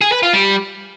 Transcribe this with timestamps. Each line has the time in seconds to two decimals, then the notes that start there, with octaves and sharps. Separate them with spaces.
0.01 G#4
0.12 B4
0.23 F4
0.33 G3